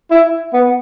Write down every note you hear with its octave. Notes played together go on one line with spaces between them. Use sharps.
E4
B3